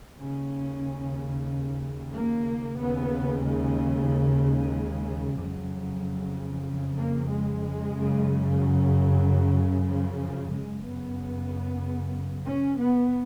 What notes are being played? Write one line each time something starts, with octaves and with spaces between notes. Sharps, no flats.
D#2 C#3 C#4
A#3
D#2 C#3 B3
G#3
G#3
F2 C#3 F#3
A#3
G#3
F#2 C#3
F#3
F3
F3
F#2 C#3 G#3
B3
C#4
B3